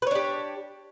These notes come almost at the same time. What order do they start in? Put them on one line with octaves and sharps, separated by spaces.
B4 C#5 D4 G4